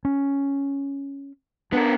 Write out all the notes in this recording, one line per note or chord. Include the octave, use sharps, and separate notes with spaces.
C#4
B3 D4 A#4